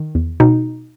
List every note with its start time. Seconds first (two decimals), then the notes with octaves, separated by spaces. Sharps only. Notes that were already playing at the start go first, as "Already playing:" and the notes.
Already playing: D#3
0.15 E2
0.40 B2 D#4